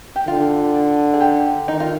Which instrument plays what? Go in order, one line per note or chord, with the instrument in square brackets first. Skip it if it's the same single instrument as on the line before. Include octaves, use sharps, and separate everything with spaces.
[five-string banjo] G4
[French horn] D3 [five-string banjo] F4
[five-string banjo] G#4
G4
[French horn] D#3 [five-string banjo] D#4
[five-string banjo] F4